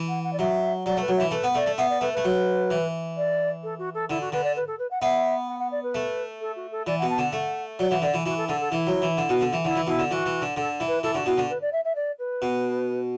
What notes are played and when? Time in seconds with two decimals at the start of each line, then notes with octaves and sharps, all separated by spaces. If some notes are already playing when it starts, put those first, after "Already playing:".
Already playing: E3
0.08 F#5
0.24 F#5
0.33 D5
0.39 F#3 E5
0.85 F#3 D5
0.97 A3 B4
1.08 F#3
1.16 E3 E5
1.31 A3 B4
1.44 B3
1.55 A3 D5
1.66 A3
1.78 B3 E5
1.90 D5
2.01 A3 B4
2.13 A3 B4
2.24 F#3
2.70 E3
3.17 D5
3.63 A4
3.78 F#4
3.94 A4
4.10 D3 E4
4.21 F#4
4.32 D3 B4
4.44 D5
4.56 B4
4.67 A4
4.79 B4
4.91 F#5
5.02 B3 E5
5.48 F#5
5.59 F#5
5.71 D5
5.83 B4
5.95 A3
6.41 A4
6.56 F#4
6.71 A4
6.87 E3 D5
6.98 F#5
7.02 B2
7.10 A5
7.18 D3 F#5
7.33 A3
7.79 F#3 D5
7.90 E3 F#5
8.02 D3 D5
8.14 E3
8.26 E3 F#4
8.37 A4
8.48 D3 A4
8.60 A4
8.72 E3 E4
8.87 F#3
9.02 E3
9.17 D3
9.29 B2
9.41 D3
9.53 E3
9.64 D3 E4
9.76 E3
9.87 B2 E4
9.99 D3
10.10 E3 F#4
10.26 E3
10.42 D3
10.57 D3 A4
10.80 E3
10.88 B4
11.03 E3 A4
11.15 D3 F#4
11.26 B2 E4
11.38 D3 F#4
11.50 B4
11.61 D5
11.72 E5
11.84 E5
11.95 D5
12.19 B4
12.42 B2